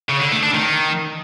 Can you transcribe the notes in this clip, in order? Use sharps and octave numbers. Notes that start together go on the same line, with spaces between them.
C#3
D3
A3
D4
D#3